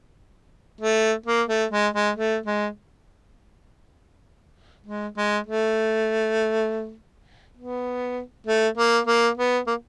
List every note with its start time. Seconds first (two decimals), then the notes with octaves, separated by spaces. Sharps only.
0.81 A3
1.26 A#3
1.48 A3
1.71 G#3
1.94 G#3
2.16 A3
2.46 G#3
4.86 G#3
5.17 G#3
5.47 A3
7.57 B3
8.47 A3
8.77 A#3
9.07 A#3
9.37 B3
9.67 A#3